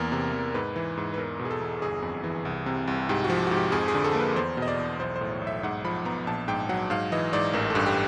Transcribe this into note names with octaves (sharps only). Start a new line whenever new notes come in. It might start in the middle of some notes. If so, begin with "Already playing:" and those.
Already playing: E2 A#3 A#4
C3
E2
G#2 B4
E3
G#2
B4
E2 A#4
B2
G#4
A4
E2
G1 G#4
F2
E3
C2
C3
C2
G#2 G4
F#4
F3
G#2 F#4
G4
F2 G#4
G#4
D3
A4
A#3
B4
E2 C5
B2
D#5
D5
E2
B1 C5
C5
A2
C#5
B1
E5
G#2 F#5
F3 B5
B3 A#5
A#1 A5
G#2 G5
F#3 F#5
G#2 F5
E3 D#5
G#2 D5
A1 A#4
G2 A4
G4